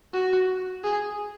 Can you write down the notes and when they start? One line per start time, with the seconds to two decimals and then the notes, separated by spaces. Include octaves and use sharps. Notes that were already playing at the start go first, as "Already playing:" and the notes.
0.13 F#4
0.84 G#4